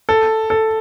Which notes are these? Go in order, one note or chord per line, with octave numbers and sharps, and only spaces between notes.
A4
A4